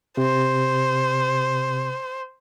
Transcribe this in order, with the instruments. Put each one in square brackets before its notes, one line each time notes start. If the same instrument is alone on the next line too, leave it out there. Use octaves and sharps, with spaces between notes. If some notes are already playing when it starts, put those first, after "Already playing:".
[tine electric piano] C3 [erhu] C5